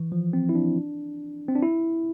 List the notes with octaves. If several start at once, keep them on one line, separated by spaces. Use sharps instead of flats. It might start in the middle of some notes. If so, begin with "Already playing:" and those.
Already playing: E3
F3
C4
E4
D4
C4
D4
E4